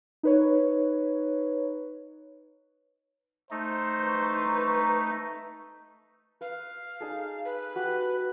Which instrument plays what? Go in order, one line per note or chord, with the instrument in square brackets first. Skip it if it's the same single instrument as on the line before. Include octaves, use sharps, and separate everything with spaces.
[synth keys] D#4 B4 C#5
[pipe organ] A3 D#4 [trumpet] C5
[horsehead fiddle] B4 [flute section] A#5 C#6
[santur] B4 [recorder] F5
[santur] D#4 G#4 A4
[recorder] B4
[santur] F#4 G4 A5